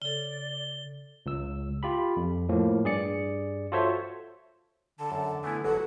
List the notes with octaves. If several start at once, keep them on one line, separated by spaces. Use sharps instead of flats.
C#3 A4 D5 G7
C#2 E6
F4 G4 B5
F2
A2 F3 A#3
G2 G#4 D5 C#7
F4 F#4 A4 C5 C#5 E5
D3 A5
F#2 D3
A3 B3 E4 G#5
G1 F#3 A4 F#5